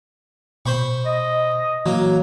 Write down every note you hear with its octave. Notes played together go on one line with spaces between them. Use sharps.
B2 C5 B5 C#6
D#5
E3 F#3 A#3